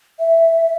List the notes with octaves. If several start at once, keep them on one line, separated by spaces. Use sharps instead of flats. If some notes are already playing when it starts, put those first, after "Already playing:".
E5